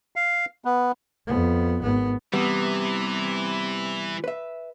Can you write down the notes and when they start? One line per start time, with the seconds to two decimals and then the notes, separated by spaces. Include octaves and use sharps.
0.16 F5
0.65 B3
1.27 F2 B3
1.83 G#1 B3
2.34 C3 E3 G3 B3 D#6
4.24 B4 E5